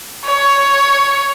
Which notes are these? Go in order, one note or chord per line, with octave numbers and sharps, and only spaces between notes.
C#5